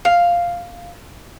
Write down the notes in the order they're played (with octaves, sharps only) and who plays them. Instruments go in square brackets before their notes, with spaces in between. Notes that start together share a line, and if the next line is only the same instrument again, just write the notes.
[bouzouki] F5